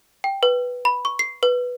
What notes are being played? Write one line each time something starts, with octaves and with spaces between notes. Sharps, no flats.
G5
B4
B5
C#6
C7
B4